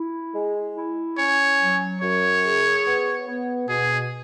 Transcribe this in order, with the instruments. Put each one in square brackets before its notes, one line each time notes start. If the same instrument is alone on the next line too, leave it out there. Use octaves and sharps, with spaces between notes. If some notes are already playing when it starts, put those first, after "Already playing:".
Already playing: [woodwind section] E4
G#3
E4
[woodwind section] C#4 [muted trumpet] C#5
[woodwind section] F#3
[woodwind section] F#2 [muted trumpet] C#5
[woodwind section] G#4
B3
B3
[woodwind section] B2 [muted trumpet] G#4